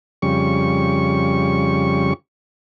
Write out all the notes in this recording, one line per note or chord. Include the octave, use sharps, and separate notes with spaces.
F2 C#3 G3 C#6